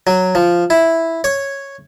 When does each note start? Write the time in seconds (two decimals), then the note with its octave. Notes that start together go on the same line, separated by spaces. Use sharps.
0.07 F#3
0.35 F3
0.70 E4
1.24 C#5